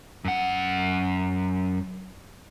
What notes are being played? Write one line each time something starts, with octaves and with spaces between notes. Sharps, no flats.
F#2 F#5